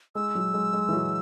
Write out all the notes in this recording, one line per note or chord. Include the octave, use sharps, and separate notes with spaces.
G#3 E6
F#3
G#3
G#3
E3
F#3